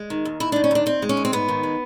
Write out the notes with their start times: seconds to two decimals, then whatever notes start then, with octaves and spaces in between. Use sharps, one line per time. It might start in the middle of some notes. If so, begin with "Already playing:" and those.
Already playing: G#3
0.10 D#3
0.25 D#2
0.40 D#2 E4
0.52 D4
0.56 D#3
0.64 C#4
0.71 D#2 D4
0.86 D#2 C4
1.02 G#3
1.09 C#4
1.17 D#2
1.25 C4
1.32 G#2 B3
1.48 D#3
1.63 G#3